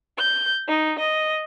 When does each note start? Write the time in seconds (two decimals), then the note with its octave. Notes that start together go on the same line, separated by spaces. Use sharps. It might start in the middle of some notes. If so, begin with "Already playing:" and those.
0.17 G6
0.68 D#4
0.99 D#5